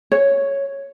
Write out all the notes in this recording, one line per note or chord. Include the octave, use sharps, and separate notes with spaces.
C#5